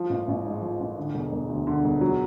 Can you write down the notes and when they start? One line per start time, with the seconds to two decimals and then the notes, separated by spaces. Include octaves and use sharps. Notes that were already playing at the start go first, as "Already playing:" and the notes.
Already playing: F3
0.10 A1
0.28 A1
0.45 G#2
0.62 F3
0.80 A1
0.97 D3
1.15 E1
1.32 E1
1.49 D2
1.67 D3
1.85 E1
2.01 F#3